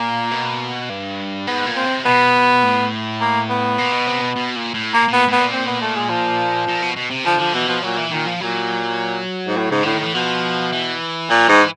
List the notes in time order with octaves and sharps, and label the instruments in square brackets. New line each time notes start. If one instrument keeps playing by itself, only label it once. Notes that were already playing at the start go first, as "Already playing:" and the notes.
Already playing: [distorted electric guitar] A#2 [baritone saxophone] A#3
[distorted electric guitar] B2
G2
[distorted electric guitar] G#2 [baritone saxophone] B3
[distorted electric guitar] A#2
[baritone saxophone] C4
[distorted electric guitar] C3
[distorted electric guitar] B2 [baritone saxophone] B3
[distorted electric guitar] A2
[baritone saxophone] A#3
B3
[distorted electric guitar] A#2
B2
C3
B2
B2
A#2
A2
[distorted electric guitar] A#2 [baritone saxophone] A#3
[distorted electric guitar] A#2 [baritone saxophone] B3
[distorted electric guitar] A2 [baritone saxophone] B3
[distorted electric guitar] A#2
[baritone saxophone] C4
B3
A3
G#3
F3
[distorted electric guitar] A#2
B2
B2
C3
[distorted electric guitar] D3 [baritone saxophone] F3
[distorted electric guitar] D3 [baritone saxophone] F3
[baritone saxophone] B2 [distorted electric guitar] E3
[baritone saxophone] B2 [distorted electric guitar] F3
[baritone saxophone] A#2 [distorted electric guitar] F#3
[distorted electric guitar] E3
[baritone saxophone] A#2 [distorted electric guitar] D#3
[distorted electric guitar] F3
[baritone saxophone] A#2 [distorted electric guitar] F#3
[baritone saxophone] G#2
A2
[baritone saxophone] G#2 [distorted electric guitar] C#3
[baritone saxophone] A2 [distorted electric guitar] D3
[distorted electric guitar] D#3
[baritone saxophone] A2 [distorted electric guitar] E3
[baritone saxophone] B2 [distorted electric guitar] F3
[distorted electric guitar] E3
[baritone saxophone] A#2 [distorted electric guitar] F3
[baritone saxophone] G#2 [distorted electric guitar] E3